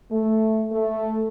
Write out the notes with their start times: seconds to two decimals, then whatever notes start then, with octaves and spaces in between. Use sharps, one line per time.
0.12 A3
0.72 A3